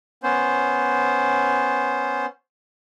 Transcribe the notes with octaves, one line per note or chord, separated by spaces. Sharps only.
B3 C#4 C5